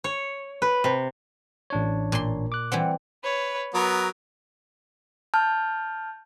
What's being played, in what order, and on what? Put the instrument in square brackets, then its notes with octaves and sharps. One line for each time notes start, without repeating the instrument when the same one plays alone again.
[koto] C#5
B4
C3
[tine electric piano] A1 D4 C#5
[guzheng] A#2 C6
[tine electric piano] D6 F#6
[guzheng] E3 G3 C4 [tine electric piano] F#5
[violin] B4 C#5
[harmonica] F#3 B3 [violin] A#4
[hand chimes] A5 F6 G6